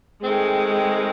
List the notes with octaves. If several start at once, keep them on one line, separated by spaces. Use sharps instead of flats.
D#3 G#3 A3 C4